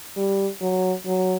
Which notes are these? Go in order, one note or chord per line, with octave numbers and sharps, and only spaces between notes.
G3
F#3
F#3